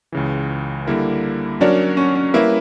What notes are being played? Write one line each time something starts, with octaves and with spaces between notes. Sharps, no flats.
C#2 C#3 E3
D3 G3 A#3 E4 A#4
F#3 C#4 D4 F#4 A#4 C#5
C#4
C#4
G3 A#3 C#4 E4 B4 E5